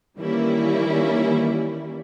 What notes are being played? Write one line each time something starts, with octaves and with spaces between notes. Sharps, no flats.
D#3 E3 G3 A#3 C#4 E4